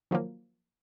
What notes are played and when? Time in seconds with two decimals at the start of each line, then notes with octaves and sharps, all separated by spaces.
0.11 D#3 F3 F#3 A#3